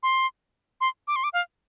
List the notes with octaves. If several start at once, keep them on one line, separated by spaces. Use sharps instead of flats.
C6
C6
D6
C6
D6
F5